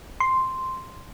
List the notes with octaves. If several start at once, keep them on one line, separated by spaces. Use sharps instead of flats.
C6